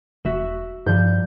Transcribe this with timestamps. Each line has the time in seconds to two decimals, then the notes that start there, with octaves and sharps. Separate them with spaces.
0.25 E1 F#4 E5 E7
0.86 G2 F3 G3 G6